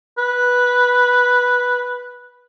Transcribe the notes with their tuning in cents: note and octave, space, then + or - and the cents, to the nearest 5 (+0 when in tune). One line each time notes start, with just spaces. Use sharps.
B4 -5